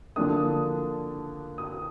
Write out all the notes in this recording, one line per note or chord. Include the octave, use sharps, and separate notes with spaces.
D3 F3 A#3 D4 D#6
D#6